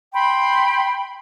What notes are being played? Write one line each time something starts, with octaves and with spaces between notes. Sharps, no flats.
G5 B5 C6